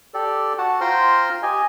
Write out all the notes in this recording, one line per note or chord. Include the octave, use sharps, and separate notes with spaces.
G4 A4 D5
F#4 F#5 A5
F4 C5 G5 A#5 C6 F6
G4 D#5 G#5